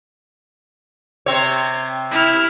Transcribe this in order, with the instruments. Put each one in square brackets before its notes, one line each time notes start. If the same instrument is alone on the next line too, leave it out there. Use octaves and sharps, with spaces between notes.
[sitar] C3 C4 C#5
[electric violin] E4 F6